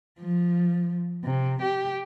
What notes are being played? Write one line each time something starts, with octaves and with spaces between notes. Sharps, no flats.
F3
C3
G4